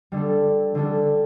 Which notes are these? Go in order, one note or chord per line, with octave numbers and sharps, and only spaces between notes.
D3 G3 D4 A4
D3 G3 D4 A4